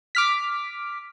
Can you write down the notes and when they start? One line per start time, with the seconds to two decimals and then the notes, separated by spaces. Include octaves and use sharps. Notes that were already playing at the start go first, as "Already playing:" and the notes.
0.15 D6 F6 B6